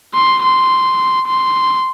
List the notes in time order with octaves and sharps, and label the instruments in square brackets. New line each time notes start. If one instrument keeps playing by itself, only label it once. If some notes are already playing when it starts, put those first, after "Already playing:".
[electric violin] C6
C6
C6